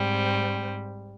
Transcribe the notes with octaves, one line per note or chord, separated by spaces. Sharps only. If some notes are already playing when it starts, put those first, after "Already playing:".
Already playing: G#2 G3 C4